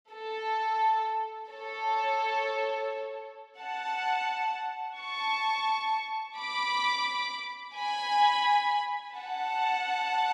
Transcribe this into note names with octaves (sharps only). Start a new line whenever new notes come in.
A4
A4 C#5
F#5 A5
A5 C#6
B5 D6
G#5 B5
F#5 A5